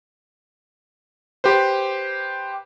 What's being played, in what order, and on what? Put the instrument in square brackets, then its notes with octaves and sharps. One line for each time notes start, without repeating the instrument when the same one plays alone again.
[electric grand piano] G4 B4 C5